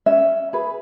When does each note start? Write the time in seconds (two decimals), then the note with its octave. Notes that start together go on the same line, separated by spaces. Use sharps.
0.06 C#4 E5
0.53 G#4 B4